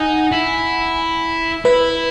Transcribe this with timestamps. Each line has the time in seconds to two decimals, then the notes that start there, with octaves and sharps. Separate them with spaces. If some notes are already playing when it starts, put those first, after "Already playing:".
Already playing: D#4 F#5 G#5
0.32 E4
1.65 E4 B4